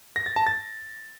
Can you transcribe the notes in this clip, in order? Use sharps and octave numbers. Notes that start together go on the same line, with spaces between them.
A#6
A6
A5
A6